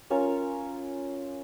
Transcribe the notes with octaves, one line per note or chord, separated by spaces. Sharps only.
C#4 F4 A#4 C#5